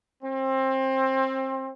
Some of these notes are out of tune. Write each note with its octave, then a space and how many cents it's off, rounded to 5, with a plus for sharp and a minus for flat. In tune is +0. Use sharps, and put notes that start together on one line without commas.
C4 +25